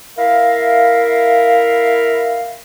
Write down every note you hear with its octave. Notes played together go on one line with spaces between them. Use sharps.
E4 A#4 E5 F5